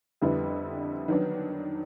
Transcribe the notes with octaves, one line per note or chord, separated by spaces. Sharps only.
F2 D3 G3 B3 E4
D#3 F#3 B3 D4